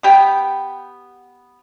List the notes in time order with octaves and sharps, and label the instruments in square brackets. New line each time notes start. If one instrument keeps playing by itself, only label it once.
[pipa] B3 G4 G5